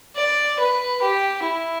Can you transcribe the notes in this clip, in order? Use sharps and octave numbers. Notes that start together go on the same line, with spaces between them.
D5
B4
G4
E4